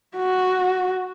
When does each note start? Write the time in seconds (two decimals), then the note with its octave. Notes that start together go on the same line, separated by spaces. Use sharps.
0.17 F#4